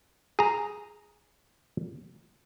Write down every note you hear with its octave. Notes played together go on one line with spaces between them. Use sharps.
G#4 A#5